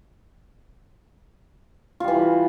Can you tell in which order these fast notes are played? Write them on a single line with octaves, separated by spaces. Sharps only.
F4 G3 E3